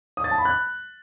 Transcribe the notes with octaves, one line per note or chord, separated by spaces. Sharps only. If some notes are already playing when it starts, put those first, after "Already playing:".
D#6
A6
A5
B5
F#6